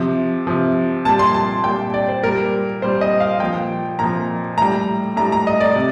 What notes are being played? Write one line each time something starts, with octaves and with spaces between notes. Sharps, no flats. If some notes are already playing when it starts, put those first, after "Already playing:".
Already playing: C3 F3
C3 F3
A#2 G3 A5
C6
A5
A#2 G3 G5
D5
C5
A#2 G3 A#4
A#2 G3 C5
D#5
F5
A#2 F3 G5
A#2 F3 A#5
A2 G3 A#5
A2 G3 A#5
A#5
D#5
D5
C3